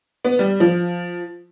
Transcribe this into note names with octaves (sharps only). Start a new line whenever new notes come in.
B3
G3
F3